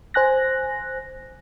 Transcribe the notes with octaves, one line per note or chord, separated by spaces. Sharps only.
C5 G#5 F#6 A#6